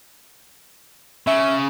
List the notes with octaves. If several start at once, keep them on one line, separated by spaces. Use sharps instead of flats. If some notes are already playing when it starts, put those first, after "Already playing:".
C#3 E5